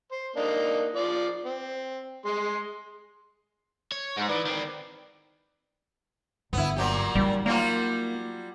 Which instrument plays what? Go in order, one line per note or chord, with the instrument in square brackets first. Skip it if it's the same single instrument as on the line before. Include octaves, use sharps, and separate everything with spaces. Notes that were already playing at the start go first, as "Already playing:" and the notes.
[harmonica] C5
A#3 D4 D#4
F3 D5
C4
G#3 C6
[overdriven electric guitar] C#5
[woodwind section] G#2 [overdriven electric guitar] G#3 G#4
[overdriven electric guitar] E3 [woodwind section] D#4 B4 D5
[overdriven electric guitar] D#3 C4
[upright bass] G1 [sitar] B3 E4
[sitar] A#2 F#3 G4
[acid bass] G3 [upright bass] D#4
[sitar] F#3 G3 F4 [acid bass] A#3